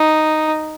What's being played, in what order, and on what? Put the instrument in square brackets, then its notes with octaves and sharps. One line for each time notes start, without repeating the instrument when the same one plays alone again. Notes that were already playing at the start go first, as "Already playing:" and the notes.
Already playing: [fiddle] D#4